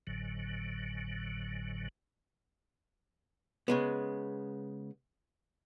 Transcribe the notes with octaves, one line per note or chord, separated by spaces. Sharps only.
G#1 A2 D3 F#3
C#3 G#3 B3